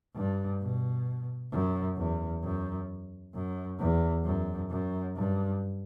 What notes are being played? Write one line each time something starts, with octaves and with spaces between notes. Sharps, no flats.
G2
B2
F#2
E2
F#2
F#2
E2
F#2
F#2
G2